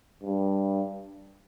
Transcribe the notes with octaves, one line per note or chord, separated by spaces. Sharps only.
G2